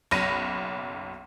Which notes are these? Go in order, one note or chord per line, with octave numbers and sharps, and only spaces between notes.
F#1 B1 B5 A#6 D#7